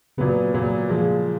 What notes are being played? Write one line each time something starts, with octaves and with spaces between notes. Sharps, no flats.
A#2 C#3 F#3 B3
A#2 F#3 B3
A#2 F3 G#3